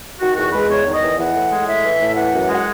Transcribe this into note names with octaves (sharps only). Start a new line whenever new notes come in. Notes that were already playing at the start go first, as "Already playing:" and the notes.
D#3 F#4
E2 F#4
G#3 B4
E2 C#5
D#3
D#5
E2
E3 F#5
A2
G#3
A2 E5
E3
A2
E3 F#5
F#2
G#3
F#5